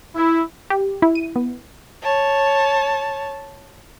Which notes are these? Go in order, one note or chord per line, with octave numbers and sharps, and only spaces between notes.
E4
G4
E4
D#7
B3
C#5 A5